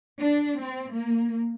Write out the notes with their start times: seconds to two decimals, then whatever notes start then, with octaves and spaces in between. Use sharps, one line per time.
0.18 D4
0.59 C4
0.91 A#3